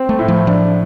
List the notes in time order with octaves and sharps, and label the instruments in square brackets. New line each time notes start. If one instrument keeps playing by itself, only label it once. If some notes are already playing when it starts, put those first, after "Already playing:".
Already playing: [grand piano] C4
[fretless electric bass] A3
[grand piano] A2
[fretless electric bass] F3
[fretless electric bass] F3 [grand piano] D4